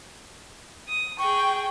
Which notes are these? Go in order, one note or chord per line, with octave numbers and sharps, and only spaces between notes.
D#6
G#4 G5 C#6